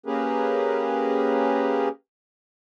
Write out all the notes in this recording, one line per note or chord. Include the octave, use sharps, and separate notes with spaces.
A#3 C#4 G4 G#4 A#4 B4